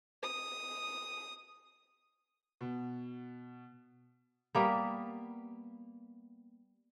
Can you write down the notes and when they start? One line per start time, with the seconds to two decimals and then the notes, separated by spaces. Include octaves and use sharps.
0.23 D#6
2.61 B2
4.55 G3 A#3 B3